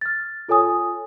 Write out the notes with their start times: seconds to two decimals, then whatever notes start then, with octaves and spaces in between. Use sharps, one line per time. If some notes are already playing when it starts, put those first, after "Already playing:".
0.01 F6 A6
0.48 F4 A4 C#5 G#5 D#6